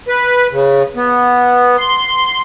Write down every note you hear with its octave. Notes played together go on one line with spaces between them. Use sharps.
B4
C#3
B3
C6